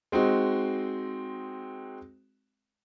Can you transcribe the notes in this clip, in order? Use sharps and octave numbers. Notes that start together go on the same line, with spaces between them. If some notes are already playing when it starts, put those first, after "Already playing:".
G#3 C4 D#4 F#4